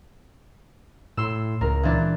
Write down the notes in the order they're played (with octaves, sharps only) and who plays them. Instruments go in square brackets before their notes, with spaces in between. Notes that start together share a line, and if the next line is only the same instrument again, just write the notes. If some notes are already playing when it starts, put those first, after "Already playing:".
[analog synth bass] A2 [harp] C6 E6
[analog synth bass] C#2 [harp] A#4
[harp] A#2 E3 D4